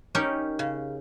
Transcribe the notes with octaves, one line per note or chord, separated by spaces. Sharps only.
C#4 D#4 G4 A#4 C#5
C#3